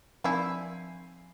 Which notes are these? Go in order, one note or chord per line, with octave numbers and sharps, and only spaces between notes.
D#3 F3 C4 D4 E4 G#5 B5 C7